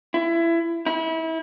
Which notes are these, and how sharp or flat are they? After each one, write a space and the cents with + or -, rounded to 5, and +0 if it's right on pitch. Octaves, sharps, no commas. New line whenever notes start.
E4 +25
E4 -30